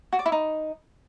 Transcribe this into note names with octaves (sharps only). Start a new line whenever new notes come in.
F#4
D5
E4
D#4